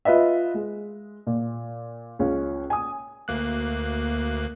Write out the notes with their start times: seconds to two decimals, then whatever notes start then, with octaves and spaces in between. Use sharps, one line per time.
0.05 F4 B4 D#5 E5
0.54 G#3
1.27 A#2
2.19 C#2 C#4 F4
2.70 G#5 D#6
3.28 D2 A#3 F#6